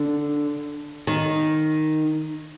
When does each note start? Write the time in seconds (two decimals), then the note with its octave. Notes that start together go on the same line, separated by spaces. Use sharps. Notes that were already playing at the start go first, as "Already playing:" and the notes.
Already playing: D3
1.07 D#3